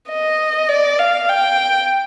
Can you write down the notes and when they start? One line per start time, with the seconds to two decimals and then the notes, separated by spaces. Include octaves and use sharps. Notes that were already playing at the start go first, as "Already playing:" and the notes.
0.10 D#5
0.69 D5
0.99 F5
1.29 G5